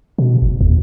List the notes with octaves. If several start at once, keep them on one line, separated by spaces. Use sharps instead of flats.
B2
F#1
D#2